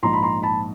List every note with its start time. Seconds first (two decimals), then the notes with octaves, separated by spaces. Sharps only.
0.02 A#1 G#2 F3 A#5 C6
0.13 B5
0.22 A#5 C6
0.43 A5 B5